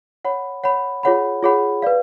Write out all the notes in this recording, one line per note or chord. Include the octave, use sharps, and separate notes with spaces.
C#5 F#5 B5
C#5 F#5 B5
F4 G#4 C#5 F#5 B5
F4 G#4 C#5 F#5 B5
B4 D5 F5